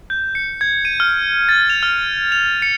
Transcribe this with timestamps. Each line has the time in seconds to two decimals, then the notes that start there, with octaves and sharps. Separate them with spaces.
0.10 G6
0.35 C#7
0.61 G#6
0.85 D#7
1.00 F6
1.49 A6
1.70 F7
1.83 F6
2.32 F7
2.62 C#7